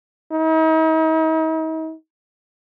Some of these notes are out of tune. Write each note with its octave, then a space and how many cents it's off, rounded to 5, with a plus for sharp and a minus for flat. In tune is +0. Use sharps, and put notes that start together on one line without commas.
D#4 +40